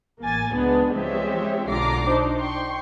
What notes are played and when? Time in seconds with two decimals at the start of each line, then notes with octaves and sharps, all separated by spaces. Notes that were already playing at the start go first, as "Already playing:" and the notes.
0.20 A1 A#3 G#5 A6
0.53 C#2 G#3 B3 D4
0.93 F3 G#3 C4 G4 C#5 E5
1.68 B1 D3 F4 A#5 D6 C7
2.07 D4 D#4 C5
2.38 G5 C6 C#6